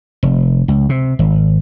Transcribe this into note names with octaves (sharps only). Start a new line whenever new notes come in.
F1
C#2
C3
G#1